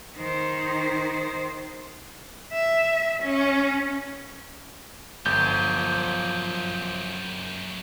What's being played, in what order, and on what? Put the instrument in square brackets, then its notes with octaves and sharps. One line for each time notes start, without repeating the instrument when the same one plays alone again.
[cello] D#3 C5
E5
C#4
[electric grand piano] G1 [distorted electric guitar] F#2 G4 [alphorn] F3 [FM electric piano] G6